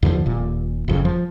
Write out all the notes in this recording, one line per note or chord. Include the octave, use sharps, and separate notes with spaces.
D#2 D3 E3 F3
D#1 A#2
F#1 F2 C#3
F3